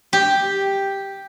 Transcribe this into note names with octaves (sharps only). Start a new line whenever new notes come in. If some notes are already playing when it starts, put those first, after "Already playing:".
G4